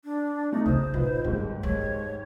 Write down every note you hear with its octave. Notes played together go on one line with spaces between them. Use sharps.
D4
A3 D#4
C#3 D4 C5 D#6
A#2 D#4 F4 B4
D#2 G#2 G3
G#3 C#5